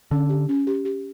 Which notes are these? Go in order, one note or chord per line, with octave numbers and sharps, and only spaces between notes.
D3 C#4
G4
C#4
G4
G4